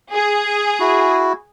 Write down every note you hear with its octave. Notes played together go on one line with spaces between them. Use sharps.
G#4
E4 F#4